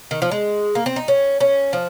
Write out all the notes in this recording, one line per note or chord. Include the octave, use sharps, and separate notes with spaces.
D#3
F3
G#3
A#3
C4
D#4
C#4
C#4
F3